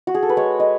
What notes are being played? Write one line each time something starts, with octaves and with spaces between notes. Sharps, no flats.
F#4
G#4
A4
B4
G#3 C#5
D#5